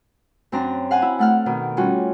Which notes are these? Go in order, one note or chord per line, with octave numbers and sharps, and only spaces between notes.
F#2 C4 D4 A#5
F5 F#5 G#5
E4
A3 F#5 F6
B2 D#3
G3 C#4 F4 F#4